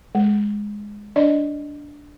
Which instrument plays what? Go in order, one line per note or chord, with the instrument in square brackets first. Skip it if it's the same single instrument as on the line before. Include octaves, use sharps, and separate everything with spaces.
[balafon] G#3
D4 D5 D#5